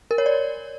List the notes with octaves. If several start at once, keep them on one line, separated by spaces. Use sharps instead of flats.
A#4
C#5
D5